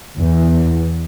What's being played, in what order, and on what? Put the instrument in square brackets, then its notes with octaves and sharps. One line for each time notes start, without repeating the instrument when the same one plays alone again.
[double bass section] E2